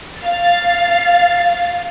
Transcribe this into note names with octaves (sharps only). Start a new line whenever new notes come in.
F5 A6